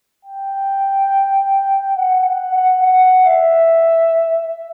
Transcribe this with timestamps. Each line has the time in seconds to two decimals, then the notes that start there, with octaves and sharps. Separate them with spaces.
0.25 G5
1.97 F#5
2.25 F#5
2.53 F#5
2.82 F#5
3.26 E5